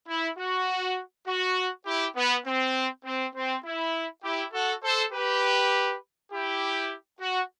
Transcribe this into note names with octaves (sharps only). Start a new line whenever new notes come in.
E4
F#4
F#4
E4 G4
B3
C4
C4
C4
E4
E4 G4
F#4 A4
A4 C5
G4 B4
E4 G4
F#4